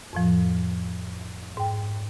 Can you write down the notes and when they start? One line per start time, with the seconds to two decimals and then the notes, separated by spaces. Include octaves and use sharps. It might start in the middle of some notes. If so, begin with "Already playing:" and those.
0.13 F2 A2 F3
1.57 G#2 G5